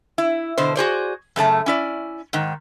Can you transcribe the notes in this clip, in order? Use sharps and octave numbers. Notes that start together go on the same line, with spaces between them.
E4
B2 D3 C5
F#4 G#4 C5 D5
F#2 C#3 A3 A5
C#4 E4 D5
G#2 D#3